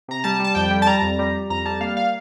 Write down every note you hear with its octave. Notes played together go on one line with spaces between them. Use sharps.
C3 A#5
G3 A5
G3 A5
F2 G5
G3
A5
G3 A#5
F2
G3
G3
F2 A#5
G3 A5
A#3 F5
F5